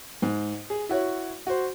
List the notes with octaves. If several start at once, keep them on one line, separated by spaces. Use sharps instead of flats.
G#2
G#4
E4 F#4 C#5
F#4 C5